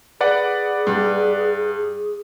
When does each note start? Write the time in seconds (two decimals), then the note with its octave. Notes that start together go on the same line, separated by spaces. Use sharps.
0.20 G#4 B4 D5 F#5
0.87 G2